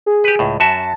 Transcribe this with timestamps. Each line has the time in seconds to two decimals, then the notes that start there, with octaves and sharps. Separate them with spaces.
0.06 G#4
0.24 G4 B4
0.39 C#2 A2
0.60 F#2 F#4 E5 A5